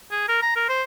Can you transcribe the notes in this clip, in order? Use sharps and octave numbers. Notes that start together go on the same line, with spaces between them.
G#4
A#4
A#5
A#4
C5